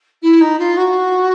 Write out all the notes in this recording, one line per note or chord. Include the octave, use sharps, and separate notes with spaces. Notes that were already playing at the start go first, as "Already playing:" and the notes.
E4
D#4
F4
F#4